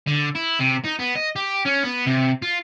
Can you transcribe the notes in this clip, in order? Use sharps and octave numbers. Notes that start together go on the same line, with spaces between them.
D3
E4
C3
D#4
B3
D#5
G4
C#4
B3
C3
F4